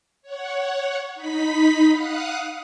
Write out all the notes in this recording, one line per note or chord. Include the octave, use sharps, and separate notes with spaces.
C#5 F#5
D#4 B5 B6
F5 F#5 D#6 F#6